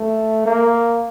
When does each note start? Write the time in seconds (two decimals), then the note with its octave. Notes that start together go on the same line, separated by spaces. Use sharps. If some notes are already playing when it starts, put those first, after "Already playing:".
Already playing: A3
0.45 A#3